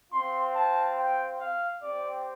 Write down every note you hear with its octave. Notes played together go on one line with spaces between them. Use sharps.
C4 F4 C6
A5
G5
F5
C4 G4 D5